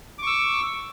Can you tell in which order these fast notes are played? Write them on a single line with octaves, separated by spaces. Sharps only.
D6 C#6 E6